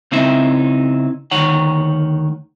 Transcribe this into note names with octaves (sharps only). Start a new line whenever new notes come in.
C#3 C4 D#4 E4 E5
D2 D#3 C#5 F#5